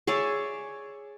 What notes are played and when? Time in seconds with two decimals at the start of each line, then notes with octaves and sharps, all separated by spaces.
0.07 G#4 C#5 D5 E5